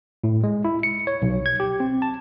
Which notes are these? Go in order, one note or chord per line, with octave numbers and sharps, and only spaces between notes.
A2
G#3
E4
C#7
C#5
B1
G#6
G4
C4
A5